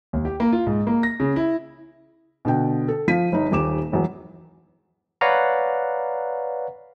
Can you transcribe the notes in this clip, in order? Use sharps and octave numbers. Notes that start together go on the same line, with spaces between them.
D#2
G4
A#3
F4
G#2
A#3
A#6
C#3
E4
B2 D3 G5
A4
F3 F5 B6 D#7
G1 D#4
D#1 D#2 D6 E7
E1 E2 F#3
B4 C#5 D5 F5 F#5 A#5